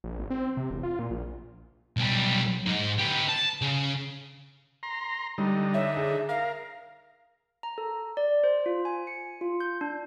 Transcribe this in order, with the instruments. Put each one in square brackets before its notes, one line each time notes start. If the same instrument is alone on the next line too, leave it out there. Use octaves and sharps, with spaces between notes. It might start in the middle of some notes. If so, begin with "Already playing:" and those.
[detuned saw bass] A#1
G#1
C4
C3
E1
F4
A#2
A#1
[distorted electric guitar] B1 G3
G#2
B3 G4
A5
C#3
[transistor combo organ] A#5 C6
[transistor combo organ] D3 D#4 [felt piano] G3
[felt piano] C#5 [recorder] E5
[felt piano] G#4
[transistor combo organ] A#4 [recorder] F5
[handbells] A#5
A4
D5
C5
F4
G#5
C#7
F4
G6
D4